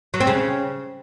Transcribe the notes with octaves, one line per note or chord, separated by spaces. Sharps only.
F#3
C4
C#3